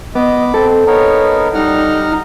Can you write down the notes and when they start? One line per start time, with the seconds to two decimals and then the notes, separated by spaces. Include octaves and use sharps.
0.15 B3 D#5 B5 D6
0.54 C4 A4
0.87 B3 D#4 A#4 C#5
1.55 G3 D#4 F#5 F6